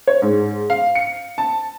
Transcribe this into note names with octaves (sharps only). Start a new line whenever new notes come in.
C#5
G#2
F5
C#7
A5